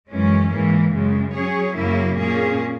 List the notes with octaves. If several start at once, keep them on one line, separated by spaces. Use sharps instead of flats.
F#2 E3 G#3 C#4
G#2 E3 A#3
F#2 C#3 G#3
F#3 C#4 G#4 C#5
F#2 C#3 F#3 A#3 E4
A#2 A#3 C#4 G#4